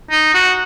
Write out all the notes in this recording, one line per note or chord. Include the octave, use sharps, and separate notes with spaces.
D#4
F#4